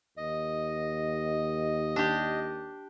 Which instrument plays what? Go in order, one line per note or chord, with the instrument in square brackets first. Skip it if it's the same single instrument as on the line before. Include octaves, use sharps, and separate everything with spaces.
[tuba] D#2 [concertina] D#5
[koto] D4 G4